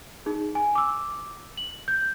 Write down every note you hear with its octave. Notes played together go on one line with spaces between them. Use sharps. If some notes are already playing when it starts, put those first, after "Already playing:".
D#4 G#4
G#5
D6 E6
F#7
G6